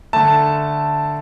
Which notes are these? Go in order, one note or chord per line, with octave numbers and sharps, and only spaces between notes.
D3 A3 A5